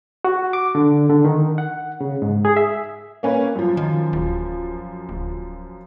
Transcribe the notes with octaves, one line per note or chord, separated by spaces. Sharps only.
F#4
D6
D3
D3
D#3
F#5
C#3
G#2
G#4
E5
A#3 C#4 B4
F#2 F3
D#3
D1
D1